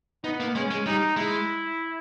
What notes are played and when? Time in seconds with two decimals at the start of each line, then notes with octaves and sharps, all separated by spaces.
0.24 B3 D#4
0.40 A#3
0.55 G#3 C#4
0.71 G#3
0.86 G3 D#4
1.17 G#3 E4